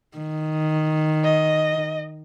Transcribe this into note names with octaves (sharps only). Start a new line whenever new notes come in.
D#3
D#5